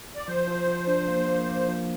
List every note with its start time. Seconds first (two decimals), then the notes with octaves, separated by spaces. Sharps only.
0.15 D5
0.27 F3 C5
0.48 F3
0.67 F3
0.87 D4
1.08 A#3
1.28 A#3
1.48 A#3
1.68 F3